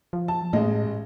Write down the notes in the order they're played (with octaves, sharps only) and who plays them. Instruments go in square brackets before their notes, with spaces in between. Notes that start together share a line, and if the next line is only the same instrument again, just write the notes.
[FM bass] F3
[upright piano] A5
[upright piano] A1 G#3 D#5 [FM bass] A2